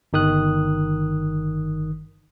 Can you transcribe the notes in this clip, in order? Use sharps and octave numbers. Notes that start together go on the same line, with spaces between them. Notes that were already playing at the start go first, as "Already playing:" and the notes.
G1 D#3 D#6 F#6